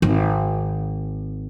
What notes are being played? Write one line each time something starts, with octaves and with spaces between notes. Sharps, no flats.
G#1